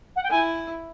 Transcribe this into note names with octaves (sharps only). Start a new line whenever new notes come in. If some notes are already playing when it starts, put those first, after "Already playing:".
F#5
G5
E4 G#5